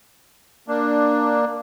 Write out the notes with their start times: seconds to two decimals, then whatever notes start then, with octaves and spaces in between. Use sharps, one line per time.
0.68 A#3 D4